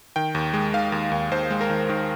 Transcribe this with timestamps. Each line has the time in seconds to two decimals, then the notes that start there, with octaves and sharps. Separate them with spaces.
0.16 D#3 G5
0.35 D#2
0.53 G#3
0.73 D#3 F5
0.92 D#2
1.12 D#2
1.31 D#2 C5
1.51 G#3
1.61 A#4
1.70 D#3
1.89 D#3